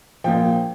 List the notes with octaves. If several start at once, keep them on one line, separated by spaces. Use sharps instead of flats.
A#1 A#2 F3 G5